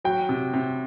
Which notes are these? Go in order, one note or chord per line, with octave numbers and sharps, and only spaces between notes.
F#3 G5
C3
C3